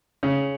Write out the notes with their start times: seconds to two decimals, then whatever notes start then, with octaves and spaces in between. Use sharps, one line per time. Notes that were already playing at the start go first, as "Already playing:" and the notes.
0.23 C#3